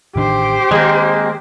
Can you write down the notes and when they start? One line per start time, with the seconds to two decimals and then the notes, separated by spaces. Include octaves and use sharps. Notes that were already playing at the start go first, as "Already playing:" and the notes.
0.16 A1 D#3 D4 G4 C5
0.71 D#3 G#3 A#3 C4